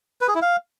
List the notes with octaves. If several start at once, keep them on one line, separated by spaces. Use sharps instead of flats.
B4
G#4
E4
F5